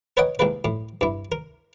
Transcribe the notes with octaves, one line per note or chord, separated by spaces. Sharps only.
A#4 B4 C#5 D#5 F#5 G5
C2 G#3 A#3 B4
A2
G2 E4
A#4